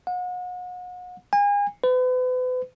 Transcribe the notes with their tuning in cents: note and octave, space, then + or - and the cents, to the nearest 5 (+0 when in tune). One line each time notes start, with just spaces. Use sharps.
F#5 -40
G#5 -35
B4 +40